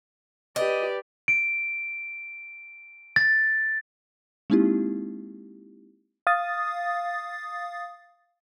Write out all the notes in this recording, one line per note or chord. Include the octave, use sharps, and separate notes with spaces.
G4 B4 D5 D#5
D7
A6
G#3 A#3 C4 D#4 E4 G4
F5 D#6 A6